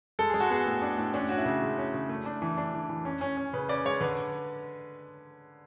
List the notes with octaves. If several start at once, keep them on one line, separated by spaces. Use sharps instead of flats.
G#3 A4
G#3 G#4
F#4
B3 G#4
A2
D4
A2
C#4 D4
C#4 F#4
E4
C#3
G#3
C#4
C#3
A3
D4
E3
D4
E3
E3
C#4
C#4
C#4
C#3 B4
C#4 D5
G#3 C#5
D3 B4